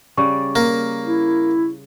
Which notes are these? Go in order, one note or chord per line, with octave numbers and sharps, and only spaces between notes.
C#3 G3 D5 C#6
A#3
E4